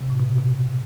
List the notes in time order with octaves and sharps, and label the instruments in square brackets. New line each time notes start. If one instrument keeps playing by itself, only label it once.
[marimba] C3
A2
B2
C3
B2